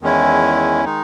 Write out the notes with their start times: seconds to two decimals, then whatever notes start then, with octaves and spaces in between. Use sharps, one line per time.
0.01 E2 D#3 G#3 C#4 E4
0.84 D#3 G#3 D#4